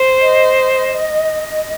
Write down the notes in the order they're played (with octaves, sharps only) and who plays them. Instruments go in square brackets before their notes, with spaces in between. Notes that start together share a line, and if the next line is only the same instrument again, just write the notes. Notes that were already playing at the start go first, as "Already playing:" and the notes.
Already playing: [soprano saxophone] C5
[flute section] D#5